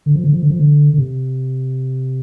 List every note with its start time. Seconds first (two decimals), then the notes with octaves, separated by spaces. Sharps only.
0.06 D3
0.15 F3
0.24 D3
0.33 F3
0.42 D3
0.50 F3
0.59 D3
0.93 D3
0.98 C3